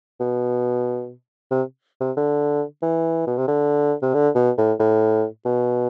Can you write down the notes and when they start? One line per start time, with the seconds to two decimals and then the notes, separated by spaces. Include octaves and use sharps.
0.20 B2
1.51 C3
2.00 C3
2.17 D3
2.82 E3
3.27 B2
3.38 C3
3.48 D3
4.02 C3
4.14 D3
4.35 B2
4.58 A2
4.79 A2
5.46 B2